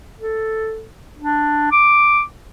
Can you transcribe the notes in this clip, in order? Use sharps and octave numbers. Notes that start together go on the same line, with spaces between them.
A4
D4
D6